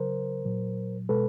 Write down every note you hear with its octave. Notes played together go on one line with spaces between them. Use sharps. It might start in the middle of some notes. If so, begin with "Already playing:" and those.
Already playing: C#3 F#3 A#4 C5
A#2 F#3
B2 G#3 A4 B4